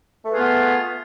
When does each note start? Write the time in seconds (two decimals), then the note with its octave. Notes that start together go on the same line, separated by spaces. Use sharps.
0.24 A3
0.28 B4
0.32 G#4
0.35 F4
0.39 B3